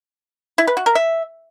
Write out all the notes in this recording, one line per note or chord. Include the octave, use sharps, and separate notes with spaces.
E4
B4
F#4
A#4
E5